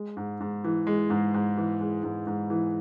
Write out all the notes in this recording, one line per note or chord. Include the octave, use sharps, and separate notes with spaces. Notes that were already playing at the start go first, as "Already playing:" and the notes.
Already playing: G#3
G#2
G#2
E3
G#3
G#2
G#2
E3
G#3
G#2
G#2
E3